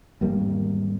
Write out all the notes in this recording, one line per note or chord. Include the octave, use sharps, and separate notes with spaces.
G#1 E2 G3 A#3